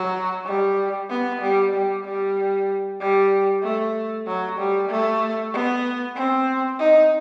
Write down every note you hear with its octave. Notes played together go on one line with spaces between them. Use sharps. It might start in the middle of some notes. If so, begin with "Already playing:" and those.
Already playing: F#3
G3
B3
G3
G3
G3
G3
A3
F#3
G3
A3
B3
C4
D#4